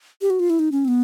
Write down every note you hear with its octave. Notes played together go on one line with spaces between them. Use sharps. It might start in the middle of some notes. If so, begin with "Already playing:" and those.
G4
F#4
F4
E4
D#4
C#4
C4
B3